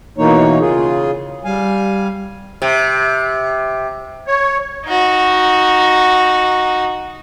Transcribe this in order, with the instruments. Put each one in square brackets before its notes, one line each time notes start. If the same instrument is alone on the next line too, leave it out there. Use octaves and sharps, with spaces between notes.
[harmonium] B2 E3 A#3 D#4 C#5
C#3 F4 G#4
G3 F5 G#5
[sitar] C3
[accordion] C#5
[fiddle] D#4 F#4